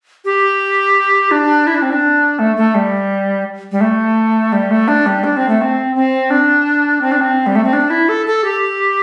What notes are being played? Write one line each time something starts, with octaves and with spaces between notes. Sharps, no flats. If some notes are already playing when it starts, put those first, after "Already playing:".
G4
D4
E4
D4
C4
D4
A3
A3
G3
G3
A3
G3
A3
D4
G3
D4
C4
A3
C4
C4
D4
C4
D4
C4
G3
A3
C4
D4
E4
A4
A4
G4